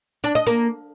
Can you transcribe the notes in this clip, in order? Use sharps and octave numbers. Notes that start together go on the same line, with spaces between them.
D4
D#5
A#3